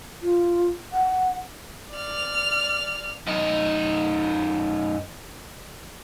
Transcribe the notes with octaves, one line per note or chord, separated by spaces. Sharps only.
F4
F#5
D5 F6
F#2 D#4